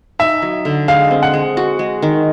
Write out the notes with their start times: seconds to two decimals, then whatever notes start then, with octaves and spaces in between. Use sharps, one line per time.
0.19 D#4 E5
0.42 F#3
0.65 D3
0.88 G#3 F5
1.11 C4
1.23 F#5
1.34 G#3
1.57 F#4
1.79 G#3
2.02 D#3